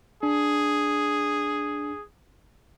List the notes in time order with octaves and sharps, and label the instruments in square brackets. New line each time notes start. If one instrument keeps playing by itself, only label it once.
[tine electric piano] D4 [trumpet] G#4